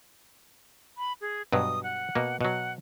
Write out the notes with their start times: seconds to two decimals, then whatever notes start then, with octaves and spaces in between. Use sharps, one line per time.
0.98 B5
1.21 G#4
1.53 G2 B2 F#3 D#6
1.83 F#5
2.15 B2 A#3
2.41 B2 F#3 F#5